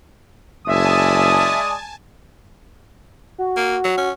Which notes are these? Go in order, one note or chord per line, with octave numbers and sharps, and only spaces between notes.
F#1 G#3 D5 E5 G#5 A5 D#6
F#4
A#3
F#3
C#4